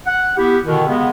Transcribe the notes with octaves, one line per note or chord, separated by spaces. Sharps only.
F#5
B3 E4 G4
B2 D3 D#3
C#3 G#3 B3